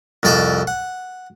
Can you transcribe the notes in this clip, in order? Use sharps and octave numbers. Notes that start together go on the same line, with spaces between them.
C2 F2 D5 D#5 A5 D6
F#5